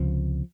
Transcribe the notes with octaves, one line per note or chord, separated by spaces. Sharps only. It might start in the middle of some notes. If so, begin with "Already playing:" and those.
Already playing: C#2 C3 F3